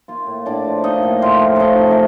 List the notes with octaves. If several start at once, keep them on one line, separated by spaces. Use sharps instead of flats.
A#3 F4 F5
A2
A2 D4 D5
F3
A#3 D#4 D#5
A2
A2 F4 F5
F3
A3 D#4 D#5 F5
C3
A#4